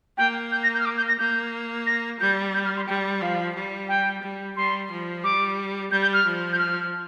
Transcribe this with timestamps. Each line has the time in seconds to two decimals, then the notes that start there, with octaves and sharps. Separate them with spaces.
0.17 A#3 G5
0.52 G6
0.63 A#6
0.74 G6
0.80 F6
0.85 D6
0.97 G6
1.08 A#6
1.19 A#3 G6
1.87 A#6
2.20 G3 G6
2.54 G6
2.65 F6
2.77 C6
2.87 G3 G5
3.21 F3 F5
3.55 G3
3.89 G5
4.22 G3
4.56 G3 C6
4.91 F3
5.24 G3 D6
5.91 G3 G6
6.02 G6
6.13 F6
6.25 F3
6.53 G6
6.58 F6